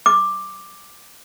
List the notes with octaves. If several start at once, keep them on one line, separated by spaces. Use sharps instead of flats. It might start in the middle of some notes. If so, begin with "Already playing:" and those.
D6